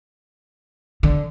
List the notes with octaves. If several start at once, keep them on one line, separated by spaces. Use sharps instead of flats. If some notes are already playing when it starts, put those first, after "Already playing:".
D3